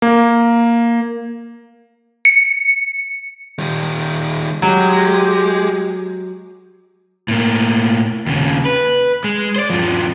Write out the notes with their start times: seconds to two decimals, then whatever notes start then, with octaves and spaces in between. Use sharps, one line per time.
0.02 A#3
2.25 C#7
3.59 D#3 G3
4.62 F#3 G#3 G4
7.28 A2 A#3
8.26 D#2 C#3
8.65 B4
9.24 G#3
9.56 C5 D5
9.70 G2 F3